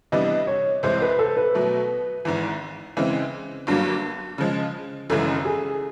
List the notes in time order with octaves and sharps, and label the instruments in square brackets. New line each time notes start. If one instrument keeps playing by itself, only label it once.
[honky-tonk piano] C3 E3 G3 B3 D4 [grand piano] D#5
[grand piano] C#5
[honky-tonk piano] C2 C3 E3 G#3 [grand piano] C5
[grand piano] B4
A4
B4
[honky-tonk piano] B2 F#3 A3
G#1 G#2 E3
C#3 E3 G#3 C4
G1 G2 D3 F#3 A#3
C#3 F3 G#3
[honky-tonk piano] G#1 F#2 C#3 E3 G#3 [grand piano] A4
[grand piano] G#4